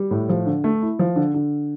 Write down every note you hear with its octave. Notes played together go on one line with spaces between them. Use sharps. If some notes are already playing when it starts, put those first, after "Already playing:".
Already playing: G3
A2
F3
D3
A3
E4
F3
D3
D3